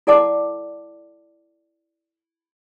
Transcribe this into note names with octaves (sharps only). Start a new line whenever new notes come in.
E4 A4 D5 F#5 A5 D6